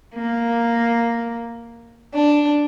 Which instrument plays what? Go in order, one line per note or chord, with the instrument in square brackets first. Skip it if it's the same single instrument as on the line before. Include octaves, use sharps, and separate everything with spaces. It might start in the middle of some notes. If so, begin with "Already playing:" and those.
[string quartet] A#3
D4